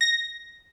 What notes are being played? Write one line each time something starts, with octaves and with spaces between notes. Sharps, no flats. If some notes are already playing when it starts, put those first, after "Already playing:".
A#6